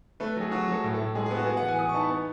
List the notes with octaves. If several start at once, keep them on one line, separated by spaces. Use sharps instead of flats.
A3 B4
F#3 G#4
F#3 F#4
F#3 A4
A2
A4
A2
G#3 G#4
G#4
B3
F#4
B3 G#4
F#5
E3
G#5
E3 D#6
C#6
D#4 A5
B5
B3 A5